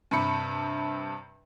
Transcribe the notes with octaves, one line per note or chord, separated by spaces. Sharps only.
G2 C3 B5 C#7